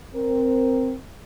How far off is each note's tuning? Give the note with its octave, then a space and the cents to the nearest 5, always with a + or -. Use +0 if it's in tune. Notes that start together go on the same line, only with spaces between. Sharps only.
C4 +0 A#4 +0